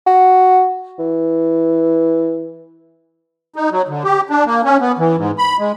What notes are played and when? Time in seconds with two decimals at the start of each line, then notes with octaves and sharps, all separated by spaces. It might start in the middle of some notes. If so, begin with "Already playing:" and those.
0.07 F#4
0.99 E3
3.56 D#4
3.71 F#3
3.89 D3
4.04 G4
4.30 D4
4.46 A#3
4.65 C#4
4.81 B3
4.99 E3
5.17 G#2
5.38 B5
5.59 G#3